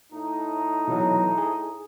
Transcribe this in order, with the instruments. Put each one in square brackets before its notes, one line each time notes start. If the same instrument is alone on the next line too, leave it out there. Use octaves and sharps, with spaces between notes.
[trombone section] A2 D#4
[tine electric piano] B2 E3 F#3
G#4